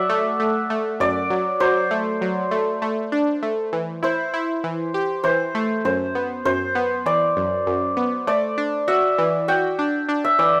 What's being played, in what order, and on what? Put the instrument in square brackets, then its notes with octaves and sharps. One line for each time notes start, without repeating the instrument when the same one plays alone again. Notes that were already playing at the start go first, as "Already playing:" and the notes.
Already playing: [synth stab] F#3 [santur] D5 E5 F#5
[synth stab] A3
A3
A3
[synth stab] F#2 [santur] D5
[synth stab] F#3
[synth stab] F#3 [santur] C5
[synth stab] A3
F#3
A3
A3
D4
A3
E3
[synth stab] E4 [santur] C5
[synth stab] E4
E3
G4
[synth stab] E3 [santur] C5
[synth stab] A3
[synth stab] F#2 [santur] C5
[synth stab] B3
[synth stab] F#2 [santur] C5
[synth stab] B3
[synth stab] E3 [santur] D5
[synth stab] F#2
F#2
B3
[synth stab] A3 [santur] D5
[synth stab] D4
[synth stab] F#4 [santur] E5
[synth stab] E3
[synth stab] F#4 [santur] G5
[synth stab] D4
D4
[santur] E5
[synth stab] E3 [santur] D5